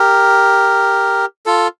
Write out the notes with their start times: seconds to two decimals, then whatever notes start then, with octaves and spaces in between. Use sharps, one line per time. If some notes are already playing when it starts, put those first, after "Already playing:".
Already playing: G4 A#4
1.46 F4 A4